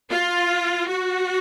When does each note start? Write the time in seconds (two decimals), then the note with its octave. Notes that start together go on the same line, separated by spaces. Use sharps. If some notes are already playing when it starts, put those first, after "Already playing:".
0.12 F4
0.89 F#4